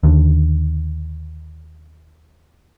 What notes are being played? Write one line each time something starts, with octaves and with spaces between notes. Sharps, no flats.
D#2 D3